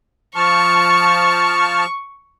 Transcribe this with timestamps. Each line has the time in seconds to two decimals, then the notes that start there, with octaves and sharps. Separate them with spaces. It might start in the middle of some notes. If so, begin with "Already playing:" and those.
0.35 F3 A5 C#6 F6